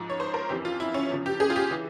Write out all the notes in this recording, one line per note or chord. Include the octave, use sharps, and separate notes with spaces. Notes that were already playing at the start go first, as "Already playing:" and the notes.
Already playing: G#2 F3
C#5
C5
A#4
F2 E3 G4
F4
E4
C#4
E2 C#3 F3
G4
G#4
F4
G4
E3